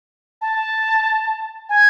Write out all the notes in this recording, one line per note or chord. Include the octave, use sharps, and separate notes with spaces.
A5
G#5